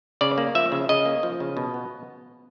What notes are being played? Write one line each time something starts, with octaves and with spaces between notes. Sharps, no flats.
C#3 D5
A#3
F3 E5
C#3
C#3 D#5
A#3
F3
C#3
B2
B3